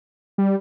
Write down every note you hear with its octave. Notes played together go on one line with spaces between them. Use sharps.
G3